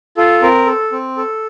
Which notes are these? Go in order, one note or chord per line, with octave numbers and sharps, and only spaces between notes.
F4 A4
C4 A#4
A4
C4
A4